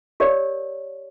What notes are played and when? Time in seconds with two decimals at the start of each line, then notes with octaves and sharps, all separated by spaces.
0.20 G4 A#4 C#5 D5